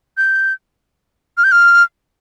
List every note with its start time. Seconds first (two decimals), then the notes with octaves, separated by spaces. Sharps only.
0.17 G6
1.38 F6
1.44 G6
1.52 F6